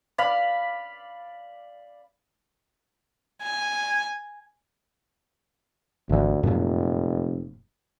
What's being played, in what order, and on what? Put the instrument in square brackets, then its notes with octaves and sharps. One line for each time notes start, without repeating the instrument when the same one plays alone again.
[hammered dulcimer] D5 F5 B5
[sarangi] G#5
[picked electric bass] G#1 E3 [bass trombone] D2
[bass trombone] F1 [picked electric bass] F#2 A#2